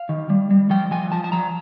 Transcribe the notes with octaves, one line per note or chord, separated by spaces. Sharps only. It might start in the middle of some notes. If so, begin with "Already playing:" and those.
Already playing: F5
D#3
G3
G3
F3 G5
F3 G#5
F3 A5
A5
F3 A#5